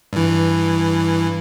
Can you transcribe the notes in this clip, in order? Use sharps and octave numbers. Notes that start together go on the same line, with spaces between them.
G2 E3